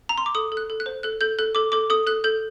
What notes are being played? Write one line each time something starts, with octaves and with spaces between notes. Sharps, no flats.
A#5
C6
D6
A4 D#6
A4
F#6
A4
F#6
C5
A4 F#6
A4 G6
A4 F#6
A4 D6
A4 D6
A4 D#6
A4 F#6
A4 G6